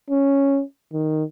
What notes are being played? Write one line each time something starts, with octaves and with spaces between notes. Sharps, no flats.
C#4
D#3